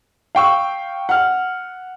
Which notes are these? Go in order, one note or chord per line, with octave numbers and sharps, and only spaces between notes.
F5 G5 C#6 E6
F#5 F6